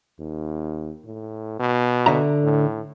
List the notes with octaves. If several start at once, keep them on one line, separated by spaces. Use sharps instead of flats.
D#2
A2
B2
D3 E5 A#5
A2